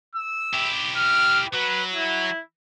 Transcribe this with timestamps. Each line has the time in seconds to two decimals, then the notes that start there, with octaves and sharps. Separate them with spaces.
0.15 E6
0.54 E4 G4
0.97 F6
1.53 F#3 B4
1.92 E4